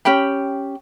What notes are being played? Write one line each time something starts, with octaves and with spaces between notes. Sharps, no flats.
C#4 G4 G5 B5